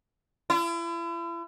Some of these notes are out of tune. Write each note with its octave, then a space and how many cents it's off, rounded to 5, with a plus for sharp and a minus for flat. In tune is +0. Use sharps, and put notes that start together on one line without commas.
E4 +40